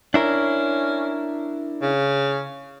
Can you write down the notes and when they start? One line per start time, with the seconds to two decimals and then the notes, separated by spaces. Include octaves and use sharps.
0.14 C#4 D4 E4 A#4
1.82 C#3